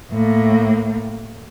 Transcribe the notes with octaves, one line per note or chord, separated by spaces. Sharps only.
A2 A#3